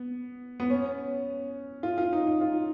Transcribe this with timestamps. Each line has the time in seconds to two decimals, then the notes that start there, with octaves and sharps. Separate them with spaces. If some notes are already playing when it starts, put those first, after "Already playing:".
Already playing: B3
0.60 B3
0.70 C#4
1.83 F4
1.98 F4
2.13 D#4
2.27 D#4
2.41 F4